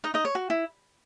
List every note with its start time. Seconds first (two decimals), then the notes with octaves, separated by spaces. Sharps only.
0.04 D#4 D#5
0.14 D#4 D#5
0.25 C#5
0.35 F#4
0.50 E4